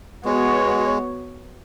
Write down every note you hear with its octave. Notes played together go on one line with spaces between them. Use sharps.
G#3 B3 F#4 C#5